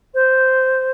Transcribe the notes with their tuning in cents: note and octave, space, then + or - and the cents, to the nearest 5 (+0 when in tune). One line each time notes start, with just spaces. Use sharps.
C5 -5